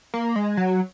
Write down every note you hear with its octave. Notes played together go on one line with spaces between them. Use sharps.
A#3
G#3
F#3